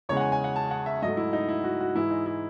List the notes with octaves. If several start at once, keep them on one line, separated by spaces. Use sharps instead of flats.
E2 C#3 G#3 C#5
F#5
G#5
G#5
F#5
A5
F#5
E5
G#2 F#3 A3 D#5
E4
D#4
E4
F#4
F#4
G#2 E3 G#3 E4
D#4
E4